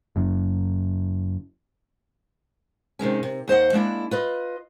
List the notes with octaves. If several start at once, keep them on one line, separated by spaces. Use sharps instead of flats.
F#1 F#2
C3 D#3 G#3 C#4
C3
D#2 C5 D#5 F#5
G#3 A#3 D4 E4
F4 B4 D#5